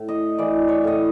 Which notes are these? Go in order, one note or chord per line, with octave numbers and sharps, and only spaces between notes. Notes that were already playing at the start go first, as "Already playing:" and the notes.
Already playing: A2
D#5
E3 D5
C#5
A2 D#5